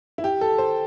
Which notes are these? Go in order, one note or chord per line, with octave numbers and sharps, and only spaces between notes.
E4
G4
A4
C5